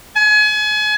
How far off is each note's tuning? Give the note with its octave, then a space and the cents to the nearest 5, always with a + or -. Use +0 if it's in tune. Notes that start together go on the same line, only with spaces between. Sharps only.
G#5 +35